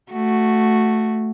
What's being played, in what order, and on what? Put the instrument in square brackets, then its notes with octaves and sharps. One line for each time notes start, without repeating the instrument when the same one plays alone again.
[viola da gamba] A3 F#4